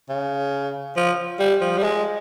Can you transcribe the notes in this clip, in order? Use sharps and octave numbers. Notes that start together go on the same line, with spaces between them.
C#3
F3
G3
F3
G3
G#3